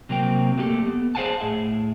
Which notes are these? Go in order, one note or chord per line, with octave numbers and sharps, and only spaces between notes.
C3 F#3 A#3 C4 G5
A3 A#3 F#4 G4 A4
B3
G#4 C5 F5 F#5 G#5 A5
A2 G#4 E5